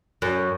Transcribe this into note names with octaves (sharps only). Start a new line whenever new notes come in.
F#2